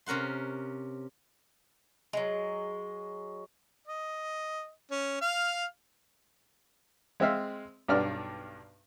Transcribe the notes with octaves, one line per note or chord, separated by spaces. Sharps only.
C3 C#4 A#4 F#5 C6
F#3 G#3
D#5
C#4
F5 F6
G#3 C4 E5 F5
B1 G2 D4 D5 F6